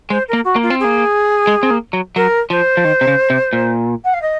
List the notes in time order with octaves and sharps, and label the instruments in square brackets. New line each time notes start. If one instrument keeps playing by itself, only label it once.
[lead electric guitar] G#3 [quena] C5
[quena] A#4
[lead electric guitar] A#3
[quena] F#4
[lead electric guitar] A#3
[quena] F4
[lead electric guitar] C4
[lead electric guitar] A#3 [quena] G#4
[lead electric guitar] G#3
C4
A#3
F#3
[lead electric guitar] F#3 [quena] A#4
[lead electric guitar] F3 [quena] C5
[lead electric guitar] F3
D#3
C3
C#3
C3
A#2
[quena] F#5
F5
D#5